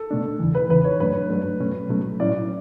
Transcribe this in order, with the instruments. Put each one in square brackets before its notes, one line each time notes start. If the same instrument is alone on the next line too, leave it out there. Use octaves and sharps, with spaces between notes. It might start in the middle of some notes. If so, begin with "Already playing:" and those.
Already playing: [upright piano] A4
[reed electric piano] B2 A3 D4
E2 C#3 E3
[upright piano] B4
[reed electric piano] E2 C#3 E3 [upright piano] B4
[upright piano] C#5
[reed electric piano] G2 F#3 A3 D4 [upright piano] B4
[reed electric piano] G2 F#3 A3 D4
B2 F#3 A3 C#4
B2 F#3 A3 C#4
[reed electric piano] A2 F#3 C#4 E4 [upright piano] D5